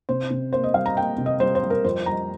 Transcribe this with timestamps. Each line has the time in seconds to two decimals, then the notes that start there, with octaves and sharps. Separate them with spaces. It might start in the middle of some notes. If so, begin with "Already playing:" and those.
0.09 C3 C5
0.31 C3
0.53 A#3 C5
0.64 D#5
0.74 G3 F5
0.86 A#5
0.97 A#3 G5
1.18 C3
1.26 D#5
1.40 G3 C5
1.55 C5
1.63 G3
1.70 A#4
1.84 F2 C5
2.06 G3 A#5